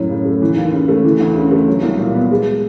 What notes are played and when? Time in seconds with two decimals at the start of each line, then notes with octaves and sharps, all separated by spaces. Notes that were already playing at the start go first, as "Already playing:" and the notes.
Already playing: F#2 A2 F#3
0.10 C#3
0.25 A3
0.42 E3
0.56 D#2
0.72 C#3
0.88 A3
1.04 E3
1.20 D2
1.36 C#3
1.51 A3
1.68 F#3
1.83 C2
1.99 A#2
2.14 B3
2.31 G#3